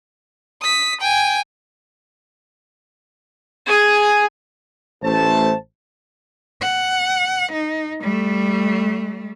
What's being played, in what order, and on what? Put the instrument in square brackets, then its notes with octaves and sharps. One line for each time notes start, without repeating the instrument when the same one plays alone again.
[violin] D#6 B6
G5 G#5
[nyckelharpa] G#4 G#5
[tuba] A1 [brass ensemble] A3 C5 A5
[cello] F#5
D#4
G3 A3